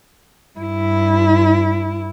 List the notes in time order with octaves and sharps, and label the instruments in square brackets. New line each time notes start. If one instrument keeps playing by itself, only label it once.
[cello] G2 E4